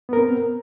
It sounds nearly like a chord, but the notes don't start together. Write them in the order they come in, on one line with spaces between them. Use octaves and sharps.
B3 A#4 C4